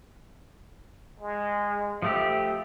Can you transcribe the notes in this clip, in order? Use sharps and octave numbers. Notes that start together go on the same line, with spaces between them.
G#3
F3 A3 G4 E5